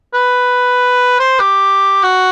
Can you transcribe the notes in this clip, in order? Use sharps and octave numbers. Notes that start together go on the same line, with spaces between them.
B4
C5
G4
F#4